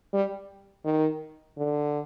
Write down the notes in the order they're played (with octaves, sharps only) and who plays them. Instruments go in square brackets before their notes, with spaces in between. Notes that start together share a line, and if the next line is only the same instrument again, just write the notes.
[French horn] G3
D#3
D3